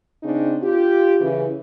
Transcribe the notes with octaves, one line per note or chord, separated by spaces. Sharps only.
C#3 C4 D4 D#4
F4 G4
C#3 E3